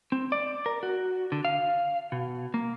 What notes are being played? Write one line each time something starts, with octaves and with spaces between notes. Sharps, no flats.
C4
D5
A#4
F#4
D3
F5
B2
A#3